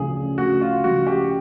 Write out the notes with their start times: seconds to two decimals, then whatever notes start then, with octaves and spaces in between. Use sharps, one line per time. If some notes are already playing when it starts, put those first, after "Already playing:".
Already playing: D2 C#3 F3 G#4
0.38 D2 F#4
0.61 F4
0.84 C#3 F3 F#4
1.07 G4